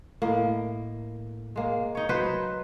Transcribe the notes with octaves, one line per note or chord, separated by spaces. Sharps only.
A2 A#3 D#5
G#3 A#3
D#4 C#5
F#3 D#4 B4 C5